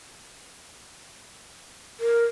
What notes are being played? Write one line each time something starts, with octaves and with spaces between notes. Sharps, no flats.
A#4